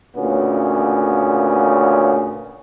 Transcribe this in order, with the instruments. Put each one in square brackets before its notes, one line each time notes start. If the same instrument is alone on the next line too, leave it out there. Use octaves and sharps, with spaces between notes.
[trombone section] D2 A#2 C#3 B3 C#4